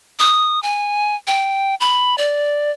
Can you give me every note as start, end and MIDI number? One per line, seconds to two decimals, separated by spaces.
0.19 0.62 87
0.63 1.16 80
1.27 1.75 79
1.80 2.15 83
2.18 2.71 74